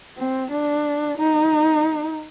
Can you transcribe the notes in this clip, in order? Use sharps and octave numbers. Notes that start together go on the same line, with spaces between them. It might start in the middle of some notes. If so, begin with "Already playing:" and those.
C4
D4
D#4